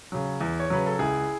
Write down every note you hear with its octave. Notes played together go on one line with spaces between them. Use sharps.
C#3 F#3
E2
C#5
C#3 F#3 B4
A4
C#2 E4 G#4